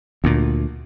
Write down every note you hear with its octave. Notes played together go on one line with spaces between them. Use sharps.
D2 A#2